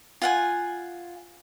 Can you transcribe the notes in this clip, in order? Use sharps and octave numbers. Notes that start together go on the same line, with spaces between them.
F4 F#5 G#5